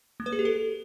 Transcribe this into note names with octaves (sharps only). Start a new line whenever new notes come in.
A#3
B4
G#4
G4
A4